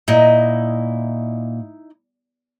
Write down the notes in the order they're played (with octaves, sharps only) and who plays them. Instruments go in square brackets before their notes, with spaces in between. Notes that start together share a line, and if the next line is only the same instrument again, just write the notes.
[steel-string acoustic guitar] A#2 [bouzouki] D#4 E4 D#5